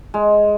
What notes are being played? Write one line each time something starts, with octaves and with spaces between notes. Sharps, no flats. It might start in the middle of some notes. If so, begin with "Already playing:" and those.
G#3